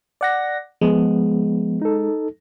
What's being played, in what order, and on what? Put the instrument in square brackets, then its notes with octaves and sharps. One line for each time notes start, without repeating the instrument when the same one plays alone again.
[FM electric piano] D5 F#5 A#6
[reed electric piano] F3 B3 [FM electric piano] G#3
[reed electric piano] D#4 A4